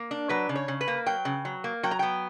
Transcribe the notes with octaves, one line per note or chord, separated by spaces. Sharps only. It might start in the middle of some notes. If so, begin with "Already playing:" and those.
Already playing: A#3
D4
F#3 B4
C#3
C#5
C#3
B4
A#3
F#3 G5
C#3
F#3
A#3
F#3 G5
A#5
B3 G5